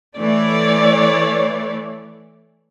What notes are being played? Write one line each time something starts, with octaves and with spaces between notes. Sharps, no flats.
E3 A3 C#5 D5